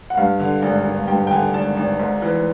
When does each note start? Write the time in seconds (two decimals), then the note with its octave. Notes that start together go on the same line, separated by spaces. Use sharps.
0.10 F#5
0.17 G2 F5
0.40 D3
0.62 G#1
0.85 G#1
1.08 G2 G5
1.27 G5
1.30 D3 G#5
1.54 G#1 A5
1.77 G#1
1.99 G#2
2.22 E3